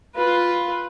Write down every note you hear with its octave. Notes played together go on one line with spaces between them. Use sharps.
F4 B4